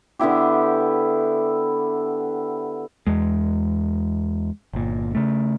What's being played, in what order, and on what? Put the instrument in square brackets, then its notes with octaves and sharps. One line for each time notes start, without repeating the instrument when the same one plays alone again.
[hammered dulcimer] D3 B3 E4 G4
[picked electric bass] E2 G#3
G1 A#2
C#3 A3